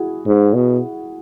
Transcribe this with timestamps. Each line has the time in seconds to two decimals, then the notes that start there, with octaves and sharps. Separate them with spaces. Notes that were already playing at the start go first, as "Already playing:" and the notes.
Already playing: E4 F#4 G#4
0.26 G#2
0.54 B2